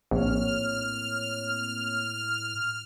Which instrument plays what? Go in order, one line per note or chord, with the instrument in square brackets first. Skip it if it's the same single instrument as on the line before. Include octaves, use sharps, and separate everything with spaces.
[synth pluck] A#1 [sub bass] A2 [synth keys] A#3 C4 C#5 [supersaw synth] F6